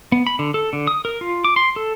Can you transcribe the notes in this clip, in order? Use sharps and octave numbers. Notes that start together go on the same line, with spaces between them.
B3
B5
D3
A4
D3
D#6
A#4
F4
D6
C6
A4